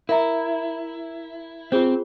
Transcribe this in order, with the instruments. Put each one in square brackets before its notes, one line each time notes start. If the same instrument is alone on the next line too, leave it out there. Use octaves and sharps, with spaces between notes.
[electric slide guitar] E4 [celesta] A#4 E5 A#5
[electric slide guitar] C4 [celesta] F4 G#4 C5